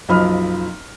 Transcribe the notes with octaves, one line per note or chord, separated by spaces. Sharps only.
F#1 B1 F3 D#5 B5 F6